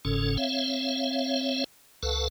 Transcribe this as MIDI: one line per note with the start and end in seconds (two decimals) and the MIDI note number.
0.05 0.37 30
0.05 0.37 44
0.05 0.37 49
0.05 0.37 61
0.05 0.37 69
0.37 1.64 60
0.37 1.64 73
0.37 1.64 76
0.37 1.64 77
2.03 2.28 37
2.03 2.28 69
2.03 2.28 71
2.03 2.28 77
2.03 2.28 78
2.03 2.28 81